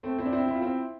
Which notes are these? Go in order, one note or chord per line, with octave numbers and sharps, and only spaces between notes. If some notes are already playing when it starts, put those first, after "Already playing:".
A3 C4
C4 E4
D4
C4 E4
C4 E4
F4
C4 E4